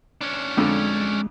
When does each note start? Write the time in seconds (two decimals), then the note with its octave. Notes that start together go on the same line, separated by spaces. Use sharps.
0.21 C#4 D4
0.57 F2 D3 G#3